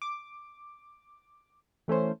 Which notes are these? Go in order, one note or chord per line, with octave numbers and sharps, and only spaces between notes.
D6
E3 A3 C#4 C5